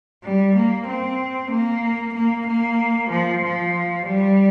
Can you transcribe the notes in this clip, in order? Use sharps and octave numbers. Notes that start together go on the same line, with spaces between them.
G3
A#3
C4
A#3
A#3
A#3
F3
F3
G3